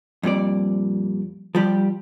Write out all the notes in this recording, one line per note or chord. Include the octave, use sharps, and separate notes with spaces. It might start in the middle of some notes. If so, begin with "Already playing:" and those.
F2 A#2 G3 D5
F3 G3 G4